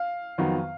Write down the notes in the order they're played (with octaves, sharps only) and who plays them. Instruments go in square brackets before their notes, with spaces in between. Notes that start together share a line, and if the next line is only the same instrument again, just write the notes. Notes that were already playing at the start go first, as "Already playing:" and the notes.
Already playing: [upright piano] F5
[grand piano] F2 D#3 F#3 B3